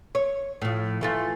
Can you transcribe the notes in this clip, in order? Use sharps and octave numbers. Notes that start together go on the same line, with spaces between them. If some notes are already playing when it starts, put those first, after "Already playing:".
C#5
A2 F3
E3 A3 F4